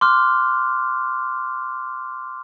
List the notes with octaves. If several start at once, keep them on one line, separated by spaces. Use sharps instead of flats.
C6 D6 F6 F#6